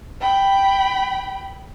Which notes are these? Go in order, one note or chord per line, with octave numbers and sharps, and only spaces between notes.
G5 B5